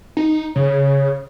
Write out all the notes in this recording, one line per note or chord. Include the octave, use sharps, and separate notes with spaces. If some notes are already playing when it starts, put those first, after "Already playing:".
D#4
C#3 C#5